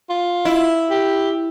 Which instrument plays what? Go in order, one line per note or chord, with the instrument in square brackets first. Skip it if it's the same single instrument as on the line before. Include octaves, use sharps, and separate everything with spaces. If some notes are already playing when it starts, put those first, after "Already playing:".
[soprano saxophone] F4
[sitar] E4
[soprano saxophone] G4